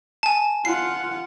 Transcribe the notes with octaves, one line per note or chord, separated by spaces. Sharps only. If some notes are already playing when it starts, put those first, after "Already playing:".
G#5 A5
F4 F#5 C7